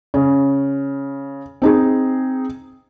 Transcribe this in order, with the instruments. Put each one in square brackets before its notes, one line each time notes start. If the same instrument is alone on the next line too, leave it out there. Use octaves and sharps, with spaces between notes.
[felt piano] C#3
C4 D#4 G#4